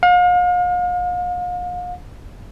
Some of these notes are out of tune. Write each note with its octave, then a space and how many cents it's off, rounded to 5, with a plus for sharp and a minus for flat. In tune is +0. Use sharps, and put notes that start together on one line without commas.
F5 +40